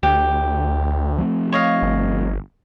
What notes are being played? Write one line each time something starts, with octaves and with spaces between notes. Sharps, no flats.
D2 G4
F3 A3 C4
C#5 D#5 F5
G1